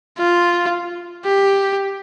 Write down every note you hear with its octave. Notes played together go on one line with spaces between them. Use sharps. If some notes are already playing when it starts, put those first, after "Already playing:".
F4
G4